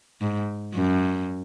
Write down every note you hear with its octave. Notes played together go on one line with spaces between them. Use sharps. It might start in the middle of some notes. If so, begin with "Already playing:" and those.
G#2
F#2